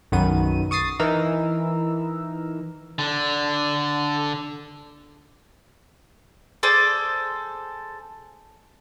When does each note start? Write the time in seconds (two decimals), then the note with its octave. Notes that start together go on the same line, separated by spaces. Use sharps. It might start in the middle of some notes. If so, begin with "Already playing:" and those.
0.12 B1 F#2 D#3 B3 D#7
0.71 C#6 D#6 A6 C7 D#7
1.00 E3 D#4 A#4 A#5 E6
2.99 D3 D4
6.63 G#4 A4 C5 D5